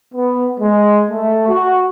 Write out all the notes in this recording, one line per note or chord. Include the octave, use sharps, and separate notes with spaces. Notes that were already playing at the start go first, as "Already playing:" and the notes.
B3
G#3
A3
F#4